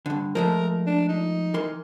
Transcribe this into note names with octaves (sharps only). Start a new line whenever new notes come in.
G2 D3
F3 G#3 A3 A#4
D4
D#4
E3 A#4 C6